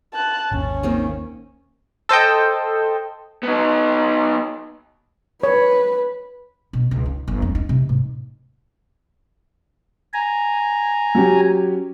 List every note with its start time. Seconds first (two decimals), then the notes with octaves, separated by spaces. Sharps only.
0.14 A5 F#6
0.52 G#1 D#2 C#4
0.83 D#3 A#3 C4
2.09 A4 C5 D#5 G5
3.43 B3 D#4
5.43 B4 C#5
6.73 B2
6.91 C#2
7.06 D#4
7.28 G1
7.42 F2
7.55 D#4
7.69 C3
7.89 G#2
10.13 G#5 A#5
11.15 F#3 C#4 G4